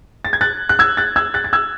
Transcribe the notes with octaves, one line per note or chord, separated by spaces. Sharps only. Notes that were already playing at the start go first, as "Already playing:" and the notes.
A6
G#6
F#6 A6
F#6
E6 G#6
F#6 A6
E6 G#6
F#6 A6
A6
E6 G#6